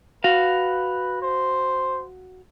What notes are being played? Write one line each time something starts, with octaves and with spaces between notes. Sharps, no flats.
F#4 B4 F5
C5